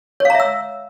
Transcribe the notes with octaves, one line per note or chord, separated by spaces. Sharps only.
C#5 E5 F5 A#5 E6